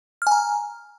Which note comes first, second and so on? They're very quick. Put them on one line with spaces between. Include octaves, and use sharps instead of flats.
F6 G#5 A#5